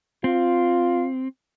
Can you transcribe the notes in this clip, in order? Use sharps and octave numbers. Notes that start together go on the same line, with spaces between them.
C4 F4